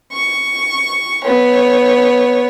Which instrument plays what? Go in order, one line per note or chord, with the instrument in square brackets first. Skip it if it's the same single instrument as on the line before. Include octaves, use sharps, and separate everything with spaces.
[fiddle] C#6
B3 C#5